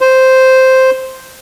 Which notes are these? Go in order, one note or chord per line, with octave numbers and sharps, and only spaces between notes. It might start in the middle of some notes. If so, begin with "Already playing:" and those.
C5